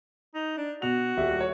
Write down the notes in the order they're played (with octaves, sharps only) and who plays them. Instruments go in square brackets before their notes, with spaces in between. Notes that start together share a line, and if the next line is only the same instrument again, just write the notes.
[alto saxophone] D#4
D4
[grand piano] B2 F7 [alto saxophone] F#4
[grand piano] D#1 G3 E5
C#5